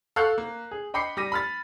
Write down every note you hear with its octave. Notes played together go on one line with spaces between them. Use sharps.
A4 F5 F#5 C#6 F#6 G6
A#3
G#4
D#5 G5 B5 D6 C7 C#7
G3 D6 A#6 D#7
B5 F6 A6